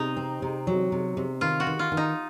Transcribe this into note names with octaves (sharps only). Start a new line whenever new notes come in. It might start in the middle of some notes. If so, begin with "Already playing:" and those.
Already playing: C3 D#4
C4
C3
F#3
C3
C3
D#3 F4
F#4
D#3
F4
D#3
D#4